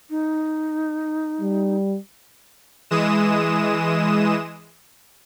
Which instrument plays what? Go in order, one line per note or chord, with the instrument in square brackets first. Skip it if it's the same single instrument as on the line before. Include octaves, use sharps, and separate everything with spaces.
[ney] D#4
[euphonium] G3
[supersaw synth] E3 G#3 D#6 E7